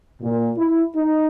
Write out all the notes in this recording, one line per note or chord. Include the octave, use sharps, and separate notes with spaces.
A#2
E4
D#4